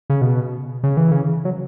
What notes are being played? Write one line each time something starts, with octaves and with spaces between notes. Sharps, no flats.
C#3
B2
C#3
E3
C#3
F#3